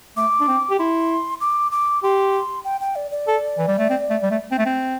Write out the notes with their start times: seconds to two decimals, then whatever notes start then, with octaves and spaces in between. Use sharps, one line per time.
0.17 A3 D6
0.40 D4
0.48 C4
0.70 G4
0.79 E4 C6
1.41 D6
1.72 D6
2.03 G4 C6
2.65 G5
2.81 G5
2.96 D5
3.11 D5
3.28 A4
3.58 E3
3.68 G3
3.78 A3
3.90 C4
4.10 A3
4.23 G3
4.30 A3
4.52 C4
4.58 A3
4.66 C4